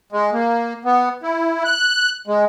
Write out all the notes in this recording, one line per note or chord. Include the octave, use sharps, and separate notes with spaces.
G#3
A#3
B3
E4
F#6
G#3